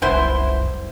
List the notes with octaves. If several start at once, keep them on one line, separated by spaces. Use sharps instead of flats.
F1 C2 F#2 B3 E4 C5